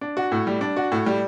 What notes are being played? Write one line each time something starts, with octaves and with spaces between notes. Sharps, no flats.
D4
F#4
A2
G3
D4
F#4
A2
G3